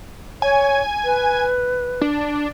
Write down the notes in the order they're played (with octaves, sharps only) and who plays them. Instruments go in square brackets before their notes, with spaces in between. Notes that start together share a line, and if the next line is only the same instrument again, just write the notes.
[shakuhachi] C#5 [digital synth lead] G#5
[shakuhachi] B4
[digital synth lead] D4